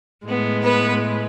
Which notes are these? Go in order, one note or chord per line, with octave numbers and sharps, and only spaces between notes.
A2 G#3 B3
B3 B4